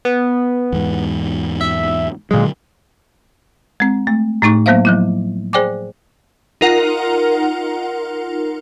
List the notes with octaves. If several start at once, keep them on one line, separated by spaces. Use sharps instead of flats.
B3
E2 G#2
E5
A#2 D3 F#3 G#3
G#3 C4
A3
A2 A3 D#4 C#6
F#3 A#3 B3 C5 E5 F5
F3 F#3 E4
G#4 C5 D5 G5 G#5 D6
D#4 F4 A#4 F#5